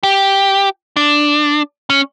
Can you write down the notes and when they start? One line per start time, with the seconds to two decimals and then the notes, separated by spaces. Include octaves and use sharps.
0.03 G4
0.97 D4
1.90 C#4